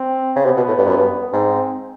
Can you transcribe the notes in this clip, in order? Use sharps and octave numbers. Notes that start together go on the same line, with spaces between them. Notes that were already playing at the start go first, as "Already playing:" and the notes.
Already playing: C4
C#3
C3 B3
B2
A2
G2
F#2
G2
G#2 C4